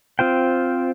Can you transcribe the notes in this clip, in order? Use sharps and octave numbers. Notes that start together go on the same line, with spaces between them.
C4 F4 C5 G5